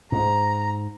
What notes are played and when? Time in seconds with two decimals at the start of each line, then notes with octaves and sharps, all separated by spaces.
0.12 G#2 A#5